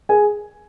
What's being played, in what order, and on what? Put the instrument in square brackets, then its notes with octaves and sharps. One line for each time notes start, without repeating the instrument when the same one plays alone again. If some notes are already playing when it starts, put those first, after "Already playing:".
[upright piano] G#4 G#5